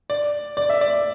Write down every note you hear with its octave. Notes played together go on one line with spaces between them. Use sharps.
D5
D5
E5
D5